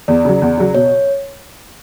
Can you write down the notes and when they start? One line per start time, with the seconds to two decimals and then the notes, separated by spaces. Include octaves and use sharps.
0.08 E2 D5
0.25 C#3 F#3
0.42 E2
0.58 C#3 F#3
0.74 B2 C#5